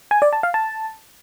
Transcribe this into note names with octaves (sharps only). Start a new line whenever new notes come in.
G#5
D5
A5
F5
A5